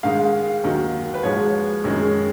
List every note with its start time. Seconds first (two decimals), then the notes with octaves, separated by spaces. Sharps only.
0.03 G#2 D#3 G#3 F5
0.63 D#2 D#3 F#3
1.14 B4
1.23 G#2 F3 G#3 C#5
1.84 F#2 D#3 G#3